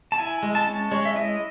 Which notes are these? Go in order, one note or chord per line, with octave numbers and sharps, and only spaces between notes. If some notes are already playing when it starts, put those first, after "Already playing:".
A5
E4 G#5
G#3
A5
C#4
G#3 C#5
E5
E4 D#5